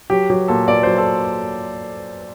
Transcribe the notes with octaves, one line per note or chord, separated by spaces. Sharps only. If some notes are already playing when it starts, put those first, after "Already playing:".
F#3 G4
F#3 G4
A#2 A4
A#2 D5
F#3 C5
A4